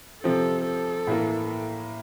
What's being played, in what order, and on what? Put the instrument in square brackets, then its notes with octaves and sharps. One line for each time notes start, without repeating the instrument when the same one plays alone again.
[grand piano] C3 F3 C4 [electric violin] A4
[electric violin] A4
[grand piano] A2 E3 A#3